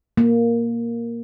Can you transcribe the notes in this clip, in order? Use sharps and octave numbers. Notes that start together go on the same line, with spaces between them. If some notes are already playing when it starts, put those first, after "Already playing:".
A#3